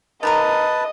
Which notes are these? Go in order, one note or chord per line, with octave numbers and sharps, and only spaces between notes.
D#3 A#3 A#4 B4 D#5 A5